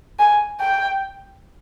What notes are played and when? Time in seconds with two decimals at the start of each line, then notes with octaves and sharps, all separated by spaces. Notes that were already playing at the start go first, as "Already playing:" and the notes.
0.19 G#5
0.60 G5